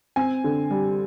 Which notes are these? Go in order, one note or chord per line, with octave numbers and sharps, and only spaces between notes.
C4 G#5
D3
G3